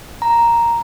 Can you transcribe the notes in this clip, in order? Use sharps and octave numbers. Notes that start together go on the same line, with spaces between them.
A#5